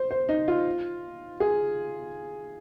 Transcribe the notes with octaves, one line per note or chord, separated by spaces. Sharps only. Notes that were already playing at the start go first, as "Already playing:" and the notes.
Already playing: C5
C5
D#4
F4
G#4